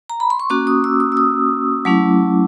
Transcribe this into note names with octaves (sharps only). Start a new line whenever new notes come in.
A#5
B5
C6
C#6
A#3 C#4 F#4 D6
D#6
E6
D#6
E6
D#6
F#3 A3 C#4 E4 D6